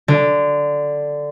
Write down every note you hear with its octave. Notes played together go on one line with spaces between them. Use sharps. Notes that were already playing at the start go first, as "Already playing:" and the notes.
D3